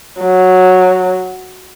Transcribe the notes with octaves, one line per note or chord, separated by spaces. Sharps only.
F#3